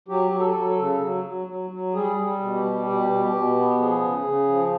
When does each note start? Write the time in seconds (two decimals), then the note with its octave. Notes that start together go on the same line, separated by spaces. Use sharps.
0.08 F#3 G4
0.31 F#3
0.40 A4
0.54 F#3
0.70 A4
0.78 C#3
1.01 F#3
1.24 F#3
1.47 F#3
1.70 F#3
1.93 G3 G#4
2.16 G3
2.40 B2
2.55 G4
2.64 G3
2.86 B2 G4
3.10 B2
3.33 B2
3.56 B3
3.79 F3 G#4
4.03 C#3
4.25 C#3
4.49 F3